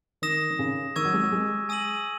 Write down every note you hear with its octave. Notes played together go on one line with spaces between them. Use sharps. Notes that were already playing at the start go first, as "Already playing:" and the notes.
D#3 D#6 A#6 E7
D#3
C#3
D#3 C#6 E6 G#6 D#7
F#3
G#3
F#3
G#3
G#5 D#6 A#6 D#7 F#7